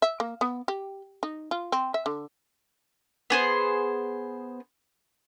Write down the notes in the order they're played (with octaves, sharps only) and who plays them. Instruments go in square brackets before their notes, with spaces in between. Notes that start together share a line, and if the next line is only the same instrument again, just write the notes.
[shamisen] E5
A#3
B3
G4
D#4
F4
C4
E5
D3
[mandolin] B3 G#4 C5